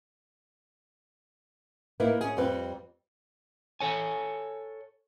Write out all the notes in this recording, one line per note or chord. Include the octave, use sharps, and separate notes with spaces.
A#3 D#4 E4 B4
C#4 G#4
F2 G3 C4 B4
A4 C#5 G#5